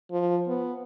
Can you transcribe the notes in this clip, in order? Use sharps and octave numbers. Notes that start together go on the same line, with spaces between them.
F3
B3